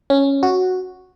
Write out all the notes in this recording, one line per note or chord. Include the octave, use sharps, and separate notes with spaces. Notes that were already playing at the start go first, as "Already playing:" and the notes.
C#4
F#4